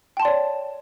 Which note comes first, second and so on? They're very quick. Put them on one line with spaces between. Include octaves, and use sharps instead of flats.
G5 A5 C6 D5 C#5